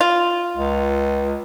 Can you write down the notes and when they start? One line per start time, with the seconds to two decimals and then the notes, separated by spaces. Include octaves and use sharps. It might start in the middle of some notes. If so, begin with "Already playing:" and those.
0.01 F4
0.57 C#2